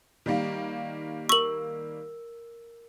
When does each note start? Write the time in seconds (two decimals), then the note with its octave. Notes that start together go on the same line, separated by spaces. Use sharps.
0.26 D#3 G3 A#3
1.29 A#4 C#6 E6 F#7